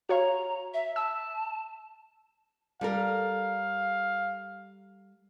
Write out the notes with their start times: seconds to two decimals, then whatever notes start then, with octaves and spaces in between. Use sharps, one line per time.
0.09 F#4 C#5 F5 A#5
0.74 E5
0.96 A5 E6
2.81 G3 A4 A#4 F5